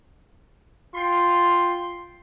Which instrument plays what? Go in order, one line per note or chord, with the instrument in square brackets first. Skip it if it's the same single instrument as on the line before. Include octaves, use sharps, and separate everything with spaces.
[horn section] F4 G5 C6